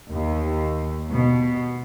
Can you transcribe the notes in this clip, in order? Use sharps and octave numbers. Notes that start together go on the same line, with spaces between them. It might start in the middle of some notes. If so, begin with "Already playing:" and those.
D#2
B2